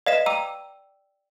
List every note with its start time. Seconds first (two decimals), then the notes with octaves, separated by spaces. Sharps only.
0.07 B4 D5 D#5 F5 B6 E7
0.26 G5 A#5 D6 E6 D#7